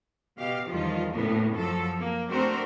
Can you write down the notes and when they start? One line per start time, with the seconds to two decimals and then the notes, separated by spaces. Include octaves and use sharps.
0.36 B2 G4 F5
0.69 E2 D#3 F3 G3 F4
1.12 D2 A2 C#3 A#3 B3
1.55 F#2 F3 F#3 A4
1.98 A#3
2.29 A3 C4 D4 F#4 A#4 C5